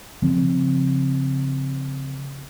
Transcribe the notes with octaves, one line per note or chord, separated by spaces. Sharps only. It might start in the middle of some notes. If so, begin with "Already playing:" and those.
C#3 F3 C4